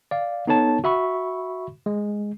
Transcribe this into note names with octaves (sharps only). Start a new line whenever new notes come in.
D5 F5
B3 D#4 A4 C#5 A5
F#4 E5 B5 C#6
G#3